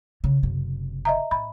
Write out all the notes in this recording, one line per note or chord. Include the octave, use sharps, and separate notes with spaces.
C#3
F#1 C3
D#5 E5 A#5
A2 B5